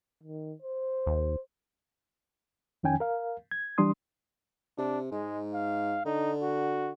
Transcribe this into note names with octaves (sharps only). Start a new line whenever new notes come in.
D#3
C5
D#2
F2 D#3 C#4 G5 G#5
A#4 F5
G#6
E3 G3 D4 C6 D#6
C3 D4
G#2 G#3
F5
D3 D#4
F#4